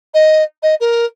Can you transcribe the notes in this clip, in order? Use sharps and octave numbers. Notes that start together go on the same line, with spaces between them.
D#5
D#5
A#4